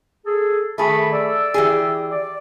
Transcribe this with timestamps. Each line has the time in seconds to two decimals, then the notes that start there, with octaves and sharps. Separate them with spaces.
0.24 G#4 A4
0.78 D#3 A3 G#4 A5 B5
1.12 D5 E6
1.54 E3 G4 G#4
2.11 D5